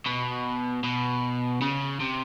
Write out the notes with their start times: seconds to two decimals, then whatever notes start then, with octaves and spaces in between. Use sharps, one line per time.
0.06 B2
0.84 B2
1.62 C#3
2.00 C3